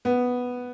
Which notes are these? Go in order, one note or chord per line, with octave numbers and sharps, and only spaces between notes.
B3